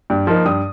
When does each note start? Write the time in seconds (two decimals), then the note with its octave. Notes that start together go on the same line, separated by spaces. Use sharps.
0.10 G2
0.27 F3 A#3 D#4
0.45 G2 D#6